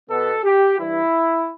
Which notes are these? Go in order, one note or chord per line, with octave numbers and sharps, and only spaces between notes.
B2 B3 A4
G4
G2 E3 G3 E4